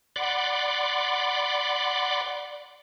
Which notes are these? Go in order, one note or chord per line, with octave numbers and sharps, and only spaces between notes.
D5 F#5 B5 C6 D6